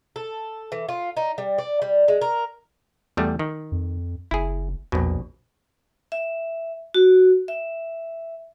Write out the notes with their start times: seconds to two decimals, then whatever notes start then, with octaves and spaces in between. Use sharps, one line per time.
0.16 A4
0.72 E3
0.89 F4
1.17 D#4
1.38 G3
1.58 D5
1.82 G3
2.08 G#3
2.21 A#4
3.17 E2 G3 A3
3.39 D#3
3.72 F2
4.31 F#1 E4 G#4
4.92 A#1 E2 B2
6.12 E5
6.94 F#4
7.48 E5